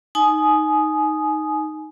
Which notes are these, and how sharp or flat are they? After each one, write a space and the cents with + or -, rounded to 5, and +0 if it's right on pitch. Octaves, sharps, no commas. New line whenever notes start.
D#4 +0 G#5 +25 D#6 -5